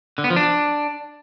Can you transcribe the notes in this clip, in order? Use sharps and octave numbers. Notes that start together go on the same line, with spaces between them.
D3
B3
F3
D4